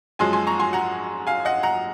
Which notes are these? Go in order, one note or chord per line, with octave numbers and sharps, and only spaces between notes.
F#2 F3 G#3 G#5 C6
G#5 C6
A#5 C#6
G#5 C6
F#5 A#5
F5 G#5
D#5 F#5
F#5 A#5